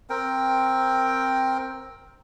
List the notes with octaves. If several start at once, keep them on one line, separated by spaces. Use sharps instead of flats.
C4 A#4 G5